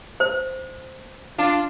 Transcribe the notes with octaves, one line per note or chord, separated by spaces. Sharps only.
C5
D4 F4